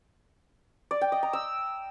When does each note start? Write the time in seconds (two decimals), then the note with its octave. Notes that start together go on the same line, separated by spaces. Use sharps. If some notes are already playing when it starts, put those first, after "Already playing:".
0.91 D5
1.01 G5
1.12 D#5
1.23 A#5
1.33 E6